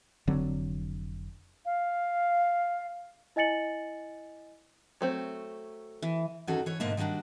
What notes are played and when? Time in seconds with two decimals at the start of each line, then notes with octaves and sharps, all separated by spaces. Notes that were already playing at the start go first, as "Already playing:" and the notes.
0.27 F1 D3 F#3 C4
1.66 F5
3.36 E4 D#5 G#5 A6 C#7 F#7
5.01 F#3 A3 C4
6.02 E3
6.47 E2 D#3 E3 C#4 F#4 A4
6.66 E3 C#5
6.80 G#2 B2 D3 A#3 E5 A5
6.97 D#3 G3 A#3 D4 F#4